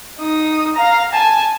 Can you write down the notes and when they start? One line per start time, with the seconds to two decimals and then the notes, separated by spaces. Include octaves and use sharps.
0.19 D#4 D#6
0.75 F5 A#5
1.12 G#5 A5